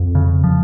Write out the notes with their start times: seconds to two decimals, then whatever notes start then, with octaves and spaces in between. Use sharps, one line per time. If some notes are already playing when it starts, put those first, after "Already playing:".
Already playing: F2
0.15 C#3
0.44 F3